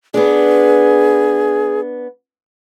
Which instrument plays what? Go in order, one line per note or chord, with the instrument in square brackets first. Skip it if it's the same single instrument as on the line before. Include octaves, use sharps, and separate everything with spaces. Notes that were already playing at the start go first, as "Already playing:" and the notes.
[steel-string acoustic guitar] B3 D4 [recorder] G#4